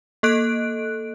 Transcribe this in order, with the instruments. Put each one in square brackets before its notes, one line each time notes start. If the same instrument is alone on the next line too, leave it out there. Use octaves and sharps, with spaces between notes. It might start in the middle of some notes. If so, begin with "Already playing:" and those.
[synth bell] A#3 A4 D#5 F#6 D7